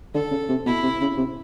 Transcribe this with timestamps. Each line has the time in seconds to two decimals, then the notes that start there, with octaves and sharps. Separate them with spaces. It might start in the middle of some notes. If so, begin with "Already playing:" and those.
0.14 D3 A4
0.31 C#3
0.49 C3
0.66 B2 E4
0.83 C3
1.01 C#3
1.17 C3